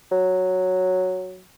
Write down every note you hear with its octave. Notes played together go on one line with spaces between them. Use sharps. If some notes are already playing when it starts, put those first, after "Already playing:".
F#3